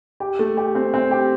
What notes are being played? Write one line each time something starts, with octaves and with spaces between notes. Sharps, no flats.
G4
A3
G4
C4
C4
G4